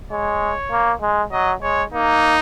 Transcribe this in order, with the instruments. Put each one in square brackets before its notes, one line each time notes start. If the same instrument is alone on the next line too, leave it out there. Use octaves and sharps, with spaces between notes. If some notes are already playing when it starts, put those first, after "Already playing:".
[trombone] G#3 [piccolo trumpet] C#5
[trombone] A#3
G#3
[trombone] F#3 [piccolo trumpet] D#5
[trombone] G#3 [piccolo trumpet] C#5
[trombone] A#3 [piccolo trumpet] D#4